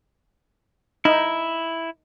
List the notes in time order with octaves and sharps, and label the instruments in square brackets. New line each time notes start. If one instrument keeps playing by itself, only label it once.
[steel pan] D#4 [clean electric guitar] E4